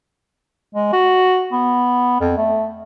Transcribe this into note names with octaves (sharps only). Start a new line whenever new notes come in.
G#3
F#4
B3
F2
A3